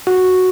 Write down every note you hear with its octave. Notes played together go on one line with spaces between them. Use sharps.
F#4